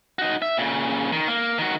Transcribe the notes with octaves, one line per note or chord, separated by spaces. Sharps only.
D#4 F#4
E5
A#2 C#3
D#3
A#3
D#3 F#4